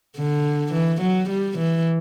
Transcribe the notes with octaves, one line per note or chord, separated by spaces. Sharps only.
D3
E3
F#3
G3
E3